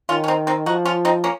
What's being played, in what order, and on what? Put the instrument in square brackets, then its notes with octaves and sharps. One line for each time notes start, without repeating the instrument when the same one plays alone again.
[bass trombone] D#3 [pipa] C#4 F4
[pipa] C#4
C4 D#4
C4 D#4
[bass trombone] F3 [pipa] D#4 F#4
[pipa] C#4 F4
C4 D#4
A#3 C#4